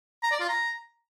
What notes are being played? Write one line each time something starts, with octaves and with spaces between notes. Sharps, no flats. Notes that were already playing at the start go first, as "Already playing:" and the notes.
A#5
D5
F4
A#5